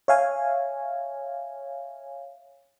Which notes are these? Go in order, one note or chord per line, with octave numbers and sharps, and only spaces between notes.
C#5 E5 F5 G#5